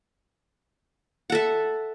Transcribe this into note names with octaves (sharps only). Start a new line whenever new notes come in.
A4 E5 F#5